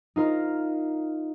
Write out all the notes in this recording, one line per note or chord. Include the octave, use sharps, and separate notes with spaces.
D#4 F4 A#4